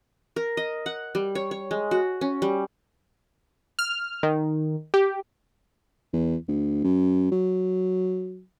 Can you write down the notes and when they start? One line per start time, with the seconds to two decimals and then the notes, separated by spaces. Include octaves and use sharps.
0.36 A#4
0.57 D#5
0.86 F#5
1.15 G3
1.35 C#5
1.51 C#5
1.71 G#3
1.91 F#4
2.21 C#4
2.42 G3
3.79 F6
4.23 D#3
4.94 G4
6.13 E2
6.48 D2
6.84 F#2
7.32 F#3